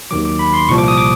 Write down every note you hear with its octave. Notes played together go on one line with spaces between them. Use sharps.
D#2 D#3 F#3 D6
D6
B5
C6
C2 A#2 F3 C#6
D6
D#6
D6